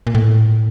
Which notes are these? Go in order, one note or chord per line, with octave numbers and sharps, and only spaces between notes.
A#2
A2